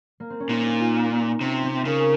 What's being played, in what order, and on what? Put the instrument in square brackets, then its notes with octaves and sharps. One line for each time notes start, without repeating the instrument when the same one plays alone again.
[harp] A#3
C4
C#4
[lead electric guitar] A#2 [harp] D#4
[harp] D#4
F4
D#4
[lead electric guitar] C3 [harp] C#4
[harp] C4
[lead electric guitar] C#3 [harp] A#4